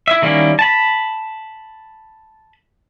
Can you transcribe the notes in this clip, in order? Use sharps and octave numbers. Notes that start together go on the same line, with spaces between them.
E4 E5
D#3 G3 A#3 C#4 E4
A5 B5